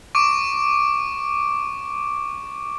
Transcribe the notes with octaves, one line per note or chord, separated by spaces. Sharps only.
C#6 D6 D7